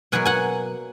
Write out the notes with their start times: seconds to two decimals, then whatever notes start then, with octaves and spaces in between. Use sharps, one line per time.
0.12 B2 F#3 A#3 F#5 G#5
0.25 F#5 G#5